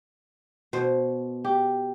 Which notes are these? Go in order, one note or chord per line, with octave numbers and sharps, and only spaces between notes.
B2 C5
G4